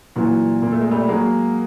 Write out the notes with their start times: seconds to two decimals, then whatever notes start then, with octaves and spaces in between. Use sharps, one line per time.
0.15 A#2 E3 F#3
0.62 A#2 A#3
0.72 A3
0.81 G#3
0.91 G3 A3
1.08 F#3 G#3 A#3